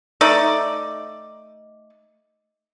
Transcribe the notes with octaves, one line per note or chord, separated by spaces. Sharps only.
A3 D#4 D5